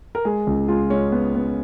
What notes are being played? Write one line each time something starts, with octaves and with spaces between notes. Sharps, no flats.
A#4
G#3 G#4
C#2
G#3 F4
G#3 C#4
B3
B3